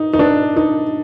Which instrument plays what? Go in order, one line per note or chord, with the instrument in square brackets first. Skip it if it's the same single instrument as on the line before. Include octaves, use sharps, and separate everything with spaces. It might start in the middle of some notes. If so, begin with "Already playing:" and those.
Already playing: [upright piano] D#4
D#4
D4
D#4